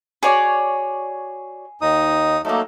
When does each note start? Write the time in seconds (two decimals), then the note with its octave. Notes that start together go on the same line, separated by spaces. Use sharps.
0.23 F#4 G#4 C#5 D5
1.81 D#2 D#4 D#6
2.45 F#3 A3 A#3 D#4 A4